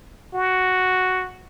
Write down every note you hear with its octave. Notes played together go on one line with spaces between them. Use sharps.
F#4